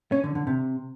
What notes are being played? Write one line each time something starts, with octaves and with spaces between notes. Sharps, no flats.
C#4
D3
D3
C3